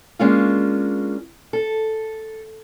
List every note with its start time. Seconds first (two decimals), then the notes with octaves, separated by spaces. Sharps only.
0.19 G#3 A#3 C#4 D4 F4
1.53 A4